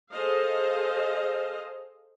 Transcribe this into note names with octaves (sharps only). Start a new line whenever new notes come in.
G#4 A4 C5 D#5 F5